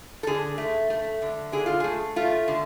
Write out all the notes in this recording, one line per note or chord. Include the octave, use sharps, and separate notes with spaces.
A4
D3 G#4
A3
A3
D3
D3 G#4
F4
A3 G#4
A3 F4
D3